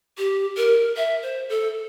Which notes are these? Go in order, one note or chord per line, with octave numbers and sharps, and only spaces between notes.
G4
A#4
E5
C5
A4